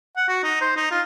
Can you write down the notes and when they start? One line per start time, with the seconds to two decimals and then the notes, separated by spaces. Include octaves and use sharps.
0.17 F#5
0.28 F#4
0.44 D#4
0.62 C5
0.77 D#4
0.91 F4